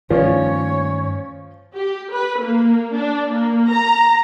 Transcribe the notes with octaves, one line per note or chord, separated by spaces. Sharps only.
G2 D#3 F3 A3 C#4 C#5 D5
G4
B4
A#3
D4
A#3
A#5